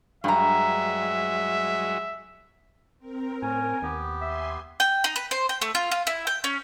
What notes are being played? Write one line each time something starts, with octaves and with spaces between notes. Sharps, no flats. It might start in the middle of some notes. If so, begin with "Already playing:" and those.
G2 F#3 G#3 E5 A#5
C4 A#4
A2 C#4 G#5
D#2 B3 G4
E5 G#5 C6
G5
D#4
B4
C5
G5
A3
F4
F4
E4
G5
C#4